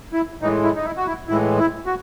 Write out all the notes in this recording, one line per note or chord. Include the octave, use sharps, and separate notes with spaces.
E4
A2 E3 G#3 D#4
E4
D#4
E4
F#4
E4
A2 E3 G#3 E4
E4
F#4